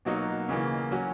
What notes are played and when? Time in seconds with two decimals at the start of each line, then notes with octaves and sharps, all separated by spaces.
0.05 B2 F#3 A#3 D#4 F#4
0.49 C#3 E3 A#3
0.91 F#3 C#4 F#4